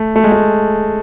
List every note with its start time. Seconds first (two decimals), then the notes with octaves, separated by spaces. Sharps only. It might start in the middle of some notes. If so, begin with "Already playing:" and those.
Already playing: A3
0.16 A3
0.24 G#3
0.32 A3